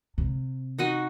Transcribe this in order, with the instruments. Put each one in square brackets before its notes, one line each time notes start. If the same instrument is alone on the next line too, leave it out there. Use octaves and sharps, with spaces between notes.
[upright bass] C3
[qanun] D#4 F#4 D#5